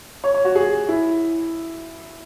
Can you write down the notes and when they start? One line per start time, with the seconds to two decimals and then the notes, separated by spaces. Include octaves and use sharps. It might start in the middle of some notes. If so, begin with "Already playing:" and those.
0.24 C#5
0.34 C#5
0.45 F#4
0.55 G#4
0.89 E4